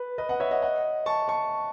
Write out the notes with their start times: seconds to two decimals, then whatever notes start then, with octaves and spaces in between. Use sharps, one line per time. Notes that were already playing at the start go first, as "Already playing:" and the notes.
Already playing: B4
0.18 B4 D#5
0.29 D#5 F#5
0.40 C#5 E5
0.51 D#5 F#5
0.62 D#5 F#5
1.06 A5 C#6
1.28 A5 C#6